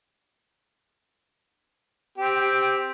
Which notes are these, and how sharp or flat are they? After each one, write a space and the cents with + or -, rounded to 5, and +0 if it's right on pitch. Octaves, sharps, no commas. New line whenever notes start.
C4 +0 G4 +10